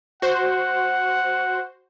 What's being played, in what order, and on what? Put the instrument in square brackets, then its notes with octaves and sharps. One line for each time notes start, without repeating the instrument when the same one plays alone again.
[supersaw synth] F#4 C5 [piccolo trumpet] F#5